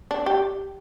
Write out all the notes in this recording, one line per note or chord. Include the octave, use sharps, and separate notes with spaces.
D4
G4